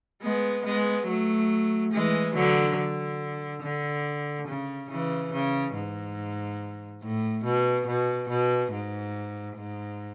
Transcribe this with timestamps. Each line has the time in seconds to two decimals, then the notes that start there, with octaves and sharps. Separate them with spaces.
0.22 G#3 B3
0.65 G#3 B3
1.07 F#3 A3
1.92 E3 G#3
2.35 D3 F#3
2.77 D3
3.63 D3
4.48 C#3
4.90 C#3 E3
5.33 C#3
5.74 G#2
7.02 A2
7.44 B2
7.87 B2
8.29 B2
8.72 G#2
9.57 G#2